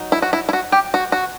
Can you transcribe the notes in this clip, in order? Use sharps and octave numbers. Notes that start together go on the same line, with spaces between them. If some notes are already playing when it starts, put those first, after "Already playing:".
Already playing: F#3 D#4
E4
F#4
E4
E4
F#4
G4
F#4
F#4